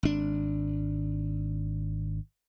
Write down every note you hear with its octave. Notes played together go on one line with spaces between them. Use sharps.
G#1 D4